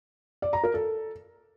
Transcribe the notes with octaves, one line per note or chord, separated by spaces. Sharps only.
D5
A#5
A#4
A4